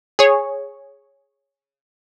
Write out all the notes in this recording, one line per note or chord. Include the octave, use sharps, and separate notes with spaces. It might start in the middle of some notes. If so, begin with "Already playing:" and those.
G#4 C#5